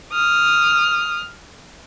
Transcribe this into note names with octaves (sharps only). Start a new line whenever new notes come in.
D#6 F6